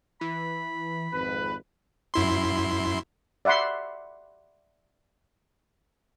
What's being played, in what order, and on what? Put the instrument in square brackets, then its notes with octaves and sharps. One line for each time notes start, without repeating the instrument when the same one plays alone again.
[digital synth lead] E3 [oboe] B5
[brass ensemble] G#1 F2 B4
[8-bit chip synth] F#2 E4 C6
[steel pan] D5 E5 F#5 B5 C6